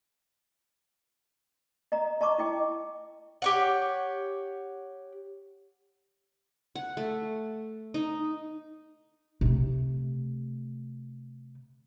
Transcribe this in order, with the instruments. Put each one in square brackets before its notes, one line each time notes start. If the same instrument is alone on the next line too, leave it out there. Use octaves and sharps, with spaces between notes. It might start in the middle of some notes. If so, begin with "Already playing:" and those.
[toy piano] D#5 A#5
D#5 A5 A#5 C#6 D6
E4 D#5 G5
[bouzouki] G4 C#5 F#5
[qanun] F#5
A3
D#4
[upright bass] C3 A3